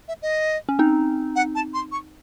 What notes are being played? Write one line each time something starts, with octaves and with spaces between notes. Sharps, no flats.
E5
D#5
C#4
C4 D#4
F#5
A5
C6
C#6